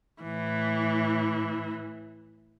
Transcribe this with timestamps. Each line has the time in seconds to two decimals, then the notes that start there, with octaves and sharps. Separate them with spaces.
0.22 A2 E3